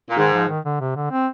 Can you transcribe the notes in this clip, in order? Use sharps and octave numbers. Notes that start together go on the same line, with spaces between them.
A#2
G#2 D#3
F3
D#3
D3
C3
D3
C4